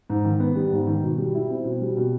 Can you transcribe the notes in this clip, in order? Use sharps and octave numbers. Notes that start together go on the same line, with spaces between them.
G#2
D#3
B3
G3
G#2
D#3
B2
G3
E4
C4
B2
G3
B2